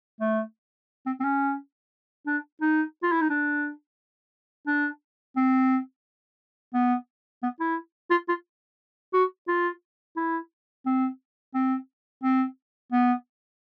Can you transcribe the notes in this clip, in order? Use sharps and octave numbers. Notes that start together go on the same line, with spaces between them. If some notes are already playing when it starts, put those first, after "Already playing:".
A3
C4
C4
C#4
D4
D#4
F4
E4
D#4
D4
D4
C4
B3
B3
E4
F4
F4
F#4
F4
E4
C4
C4
C4
B3